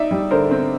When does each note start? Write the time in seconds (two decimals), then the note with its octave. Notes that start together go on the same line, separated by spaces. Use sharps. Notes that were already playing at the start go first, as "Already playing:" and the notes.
Already playing: D#4 D5 E5
0.11 G3
0.31 D3 A#4 C5
0.51 C4